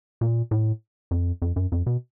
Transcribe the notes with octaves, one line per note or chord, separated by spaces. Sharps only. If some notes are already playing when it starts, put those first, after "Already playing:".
A#2
A2
F2
F2
F#2
F2
B2